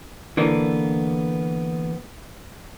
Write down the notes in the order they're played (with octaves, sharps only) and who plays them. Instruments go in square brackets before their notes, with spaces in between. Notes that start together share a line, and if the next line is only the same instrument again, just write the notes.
[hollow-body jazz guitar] D3 E3 A#3 B3